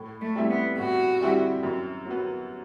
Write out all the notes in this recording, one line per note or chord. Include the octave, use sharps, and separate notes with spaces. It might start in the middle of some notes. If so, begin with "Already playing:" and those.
Already playing: A2
A3
G3 C4 E4 G4
B3
A2 F#4
G3 C4 E4 G4
F#2
F#3
B3